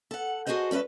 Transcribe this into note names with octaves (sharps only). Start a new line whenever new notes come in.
A4 F#5
F#4 G#4 A4 C5 D#5
G2 C#4 E4 B4 E5